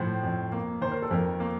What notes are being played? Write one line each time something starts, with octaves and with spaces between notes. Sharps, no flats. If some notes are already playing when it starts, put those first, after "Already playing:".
Already playing: A2 F3 C5
F2
A#3
D#3 C5
A#4
A4
F2 A#4
A#3